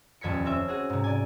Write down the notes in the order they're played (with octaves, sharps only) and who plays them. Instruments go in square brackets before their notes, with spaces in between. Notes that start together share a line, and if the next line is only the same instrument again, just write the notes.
[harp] D#1 F2 G#6 B6 C#7
C4 C#4 E5
F#4 G#4
G#2 C3
D5 G#5